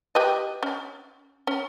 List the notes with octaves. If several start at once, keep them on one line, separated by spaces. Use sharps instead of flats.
G4 B4 D#5
C#4
C#4